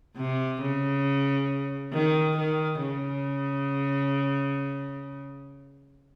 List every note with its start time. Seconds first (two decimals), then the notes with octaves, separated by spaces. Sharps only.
0.17 C3
0.61 C#3
1.93 D#3
2.37 D#3
2.81 C#3